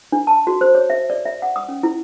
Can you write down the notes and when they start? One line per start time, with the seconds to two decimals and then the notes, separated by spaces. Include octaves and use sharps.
0.12 D4
0.27 A5
0.47 F#4
0.61 C5
0.75 C#5
0.90 E5
1.10 D5
1.25 E5
1.42 F#5
1.56 D#6
1.68 C#4
1.83 E4